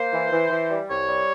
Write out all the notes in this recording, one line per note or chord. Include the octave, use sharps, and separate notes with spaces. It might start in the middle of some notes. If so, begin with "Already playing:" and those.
Already playing: A#3 C5
E3
E3
E3
G3
C2 C#5
G3